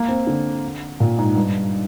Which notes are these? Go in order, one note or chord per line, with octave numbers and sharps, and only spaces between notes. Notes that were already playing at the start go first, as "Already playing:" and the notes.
Already playing: A#3
C4
D3
A#2
G#2
G2